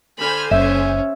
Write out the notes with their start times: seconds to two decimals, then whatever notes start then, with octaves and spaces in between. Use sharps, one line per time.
0.19 D3 C5 G#5 B5 F6
0.51 F#1 C#4 E5